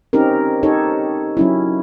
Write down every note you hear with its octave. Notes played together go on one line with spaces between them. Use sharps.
C4 C#4 D#4 G4 A#4
D#4 G4 A4 C#5
F#3 C#4 E4